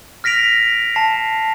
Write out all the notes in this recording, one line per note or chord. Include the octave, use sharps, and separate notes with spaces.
F6 A#6 B6 D7 F7
A5 C7